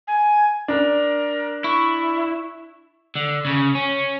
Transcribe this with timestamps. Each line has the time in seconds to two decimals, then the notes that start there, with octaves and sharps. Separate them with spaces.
0.07 G#5
0.68 D4 A#4
1.64 E4 C#6
3.16 D3
3.46 C#3
3.75 C#4